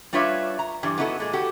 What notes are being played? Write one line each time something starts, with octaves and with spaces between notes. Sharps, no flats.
G3 D4 F4 B4 C#5 E5
A#5
G2 E3 G3
B3 D#4 E4 F#4 G4 A4
A#2 G#3
F#4 G4 A4